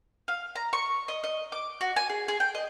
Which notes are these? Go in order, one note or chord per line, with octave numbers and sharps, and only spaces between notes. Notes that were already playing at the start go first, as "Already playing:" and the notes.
F5
A#5
C#6
D#5
D#5
D6
F#4
G#5
G#4
G#4
G5
D#5